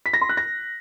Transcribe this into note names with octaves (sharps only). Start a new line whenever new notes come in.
B6
A#6
C6
F#6
A#6